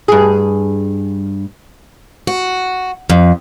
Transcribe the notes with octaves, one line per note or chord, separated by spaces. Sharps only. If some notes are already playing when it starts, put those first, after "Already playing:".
G2 G#4
F#4
F2